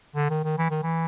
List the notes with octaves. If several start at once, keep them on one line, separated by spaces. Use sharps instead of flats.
D3
D#3
D#3
E3
D#3
E3